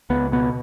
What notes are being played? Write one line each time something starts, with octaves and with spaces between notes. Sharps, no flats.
C#2 B3
B2 B3